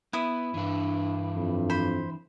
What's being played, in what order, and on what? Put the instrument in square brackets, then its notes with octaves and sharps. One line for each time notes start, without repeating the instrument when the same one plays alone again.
[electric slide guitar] B3 [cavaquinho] E4 D#6
[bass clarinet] G2 [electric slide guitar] E3 D4
[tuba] F2
[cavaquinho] C5 B5